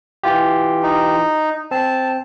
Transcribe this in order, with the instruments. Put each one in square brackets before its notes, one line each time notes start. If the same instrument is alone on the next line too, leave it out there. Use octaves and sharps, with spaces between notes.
[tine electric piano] E3 F4 G4
[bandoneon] D#4
[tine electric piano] C4 [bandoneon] A5